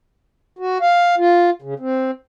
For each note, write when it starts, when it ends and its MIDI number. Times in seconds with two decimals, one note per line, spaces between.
0.59 0.78 66
0.81 1.15 77
1.18 1.50 65
1.62 1.74 49
1.80 2.11 60